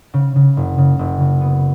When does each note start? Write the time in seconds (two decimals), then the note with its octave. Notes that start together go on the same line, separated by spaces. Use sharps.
0.14 C#3
0.36 C#3
0.57 F#1
0.78 C#3
0.99 F#1
1.20 C#3
1.41 B3